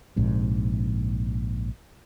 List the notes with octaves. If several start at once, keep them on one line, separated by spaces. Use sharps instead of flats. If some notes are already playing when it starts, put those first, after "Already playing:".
A#1 G#2 C3